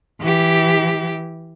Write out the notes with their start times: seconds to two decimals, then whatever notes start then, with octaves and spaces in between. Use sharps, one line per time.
0.21 E3 G4